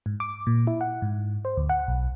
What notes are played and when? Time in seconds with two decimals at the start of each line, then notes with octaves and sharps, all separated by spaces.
0.06 G#2
0.20 D6
0.47 A#2
0.67 E4
0.81 F#5
1.02 G#2
1.45 C5
1.57 D2
1.69 F#5
1.88 B1